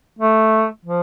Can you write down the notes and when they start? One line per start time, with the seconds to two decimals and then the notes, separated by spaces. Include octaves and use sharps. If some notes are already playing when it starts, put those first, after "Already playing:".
0.19 A3
0.85 F3